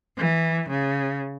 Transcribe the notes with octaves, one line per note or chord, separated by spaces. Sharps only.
E3
C#3